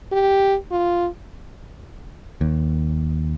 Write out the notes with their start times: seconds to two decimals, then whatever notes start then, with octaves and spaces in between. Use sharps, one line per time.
0.12 G4
0.71 F4
2.41 D#2